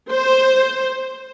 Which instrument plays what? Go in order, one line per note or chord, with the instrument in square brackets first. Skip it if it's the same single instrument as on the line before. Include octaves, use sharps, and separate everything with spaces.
[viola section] C5